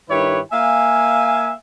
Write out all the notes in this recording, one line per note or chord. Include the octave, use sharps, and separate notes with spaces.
G2 D#3 E4 G4 B4 C#5
A#3 E5 F5 G#5